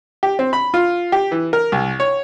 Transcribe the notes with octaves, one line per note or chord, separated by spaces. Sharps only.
G4
C4
B5
F4
G4
E3
A#4
C2
C#5